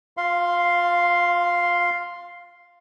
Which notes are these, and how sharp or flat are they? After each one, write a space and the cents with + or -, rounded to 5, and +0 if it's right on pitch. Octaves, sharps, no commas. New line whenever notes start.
F4 +25 F5 +0 C6 +0